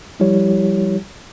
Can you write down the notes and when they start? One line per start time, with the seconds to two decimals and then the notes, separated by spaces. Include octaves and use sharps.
0.20 F3 G3 E4 G4 C#5